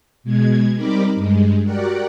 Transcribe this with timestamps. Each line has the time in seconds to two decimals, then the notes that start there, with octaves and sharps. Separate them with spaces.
0.24 B2 G#3 G#6
0.76 G3 C4 D#4 A#4 B5 D6
1.15 G2 G#3
1.64 F#4 G4 A#4 D5 F#5